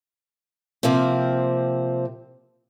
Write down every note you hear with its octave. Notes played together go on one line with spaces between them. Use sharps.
C3 F3 A#3 C4